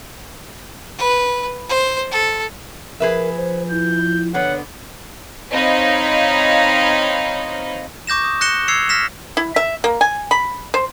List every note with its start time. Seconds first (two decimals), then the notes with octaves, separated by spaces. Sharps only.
0.99 B4
1.70 C5
2.11 A4
3.00 F3 G#4 A#4 B4 E5
3.37 C5
3.71 E4 G6
4.34 D3 B3 C#5 F#5
5.52 C4 D#4 C#5 D#5 F5 B5
8.07 C#6 D6 G6 A#6 E7
8.24 D#6
8.41 F#6 A#6 C#7 E7 G7
8.68 E6 G#6 C7 C#7 F7
8.89 F6 A#6 B6 E7
9.37 E4
9.56 E5
9.84 A#3
10.01 G#5
10.31 B5
10.74 C5